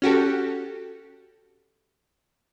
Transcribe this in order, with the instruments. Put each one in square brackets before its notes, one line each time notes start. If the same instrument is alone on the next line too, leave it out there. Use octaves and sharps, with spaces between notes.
[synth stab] C#4 F#4 G4 A4